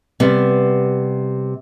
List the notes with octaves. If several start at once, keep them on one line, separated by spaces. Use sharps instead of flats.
C3 G3 B3